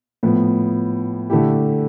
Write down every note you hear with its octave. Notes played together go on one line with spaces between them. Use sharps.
A2 F3 B3
D3 A3 E4 G4